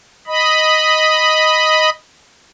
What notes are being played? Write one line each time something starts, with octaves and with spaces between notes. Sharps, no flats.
D#5 B5